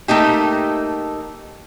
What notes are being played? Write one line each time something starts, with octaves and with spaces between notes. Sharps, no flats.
A3 A#3 D#4 G4